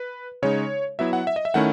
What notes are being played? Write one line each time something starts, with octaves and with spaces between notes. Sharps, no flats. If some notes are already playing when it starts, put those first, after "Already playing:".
Already playing: B4
C#3 G#3 D#4 C#5
F#3 B3 E4 E5
F#5
E5
D#5
E5
D#3 A3 C#4 E4 F#5